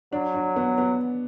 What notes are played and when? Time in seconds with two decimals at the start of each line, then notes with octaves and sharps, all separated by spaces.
0.13 F#3 D4
0.34 D4
0.56 B3
0.78 B3